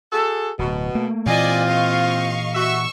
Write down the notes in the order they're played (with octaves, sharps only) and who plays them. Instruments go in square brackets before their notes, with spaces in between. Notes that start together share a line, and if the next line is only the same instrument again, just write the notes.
[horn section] F#4 G#4 A4
[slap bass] D1 [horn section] B2
[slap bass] A3 A#3
[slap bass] A#2 E3 [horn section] C4 F4 [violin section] D5 D#5 G#5
[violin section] D#5 F5 C#6
[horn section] F#4 E5 [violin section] C#6 E6